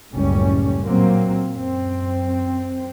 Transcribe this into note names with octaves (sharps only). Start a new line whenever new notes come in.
F#1 C#2 A2 G3 C#4
A#2 F#3 A#3 C4
F#2 C4